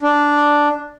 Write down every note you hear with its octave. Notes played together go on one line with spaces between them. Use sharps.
D4